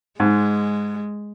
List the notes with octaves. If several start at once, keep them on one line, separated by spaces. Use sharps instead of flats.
G#2 G#3